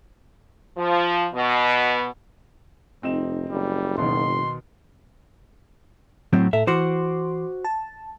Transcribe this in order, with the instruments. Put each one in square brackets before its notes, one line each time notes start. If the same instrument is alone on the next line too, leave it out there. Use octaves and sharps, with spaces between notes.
[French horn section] F3
B2
[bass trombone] F1 [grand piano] C4 D#4 E7
[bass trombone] F#1 [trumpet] G3
[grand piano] B2 D#3 [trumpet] C6
[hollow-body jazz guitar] A2 F#3 C4
[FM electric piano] A2 A4 [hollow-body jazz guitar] E5
[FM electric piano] E3 C6 D6 [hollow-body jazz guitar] F#4 C5
[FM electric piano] A5